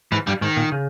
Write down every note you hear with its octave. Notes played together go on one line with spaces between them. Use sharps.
G#2 E3
G2 G3
G#2 D#3
A#2
C#3